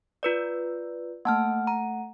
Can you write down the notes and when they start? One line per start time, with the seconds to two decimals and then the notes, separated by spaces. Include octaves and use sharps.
0.23 F4 B4 D5
1.25 A3 A#3 F#5 A5 F6
1.67 A#5